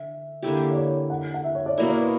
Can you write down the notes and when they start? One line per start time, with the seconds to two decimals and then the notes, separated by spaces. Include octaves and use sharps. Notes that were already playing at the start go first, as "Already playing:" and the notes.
Already playing: D3 E5
0.43 D3 A#3 E4 G4
0.71 D5
0.76 C#5
1.10 F#5
1.34 F#5
1.44 E5
1.55 C#5
1.66 D5
1.78 B2 A#3 E4 D5
1.89 D5
2.00 B4